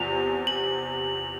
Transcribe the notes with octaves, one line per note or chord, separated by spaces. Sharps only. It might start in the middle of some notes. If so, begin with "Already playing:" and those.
Already playing: E2 C3 F3 F7
F#7